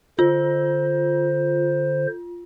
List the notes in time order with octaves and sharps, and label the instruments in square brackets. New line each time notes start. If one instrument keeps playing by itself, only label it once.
[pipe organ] D3 C5 [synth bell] F4